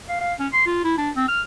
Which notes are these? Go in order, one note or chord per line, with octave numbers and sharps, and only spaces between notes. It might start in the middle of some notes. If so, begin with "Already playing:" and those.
F5
F5
C#4
C6
F4
E4
D4
C4
F6